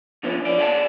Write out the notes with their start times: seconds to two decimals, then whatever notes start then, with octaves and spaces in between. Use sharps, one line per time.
0.23 D3 F3 B3 C#4
0.45 F2 F3 D5
0.58 G#4 D5 F#5 G5 A5